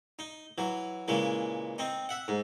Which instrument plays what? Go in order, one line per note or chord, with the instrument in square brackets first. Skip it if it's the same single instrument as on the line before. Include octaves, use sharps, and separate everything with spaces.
[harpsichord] D#4
E3 F#3
A#2 C#3 E3 G#3
C4 D#4
E5 F#5
G#2